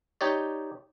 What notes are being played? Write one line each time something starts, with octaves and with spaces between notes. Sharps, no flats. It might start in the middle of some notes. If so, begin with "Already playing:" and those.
D#4 G4 C#5 D5